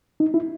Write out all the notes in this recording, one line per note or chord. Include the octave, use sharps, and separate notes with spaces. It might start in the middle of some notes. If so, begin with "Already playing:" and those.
D#4
E4